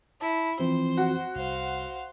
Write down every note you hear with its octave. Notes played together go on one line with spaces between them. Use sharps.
E4 A5
E3 F3 C4 C5
F#4
C2 C5 F5